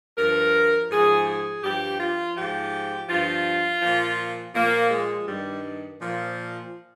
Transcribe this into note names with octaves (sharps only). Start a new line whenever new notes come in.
G2 F3 A#4
G#2 F3 G#4
G#4
G2 F3 G4
F4
G#2 F3 G4
G2 F3 F4
A#2 F3
A#2 F3 A#3
G#3
G2 D#3 G3
A#2 F3